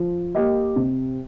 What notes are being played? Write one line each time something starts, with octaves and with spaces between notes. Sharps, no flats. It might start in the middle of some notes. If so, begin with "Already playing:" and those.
Already playing: F3
A#3 G4 D#5
C3